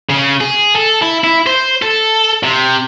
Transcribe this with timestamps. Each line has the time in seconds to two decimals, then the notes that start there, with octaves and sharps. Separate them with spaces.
0.09 C#3
0.41 G#4
0.75 A4
1.02 E4
1.24 E4
1.47 C5
1.82 A4
2.43 C3